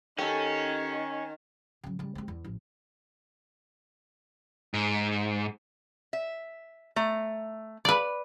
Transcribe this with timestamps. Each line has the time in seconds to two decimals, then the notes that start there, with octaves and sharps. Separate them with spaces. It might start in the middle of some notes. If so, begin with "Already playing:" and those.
0.19 D#3 C#4 G4 A4
1.84 C#3 F#3
1.99 C#3 G3
2.15 G#3 C4
2.28 E2
2.44 A1 F3
4.74 G#2
6.13 E5
6.96 A3 A#5
7.85 B4 D5